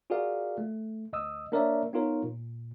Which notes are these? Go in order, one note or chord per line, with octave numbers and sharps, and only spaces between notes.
F4 F#4 G#4 A#4 D5 F5
A3
D2 D#5 D#6 E6
A#3 D4 A#4 C#5 D5 E5
B3 D#4 F4 A#4 C#5
A#2